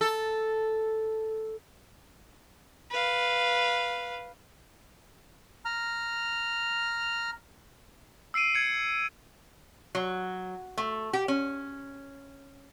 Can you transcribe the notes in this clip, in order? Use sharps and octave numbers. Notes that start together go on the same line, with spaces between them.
A4
B4 F5
A#5 F6
E6 C7 D7 D#7
G#6 C#7
F#3
A3
G4
C#4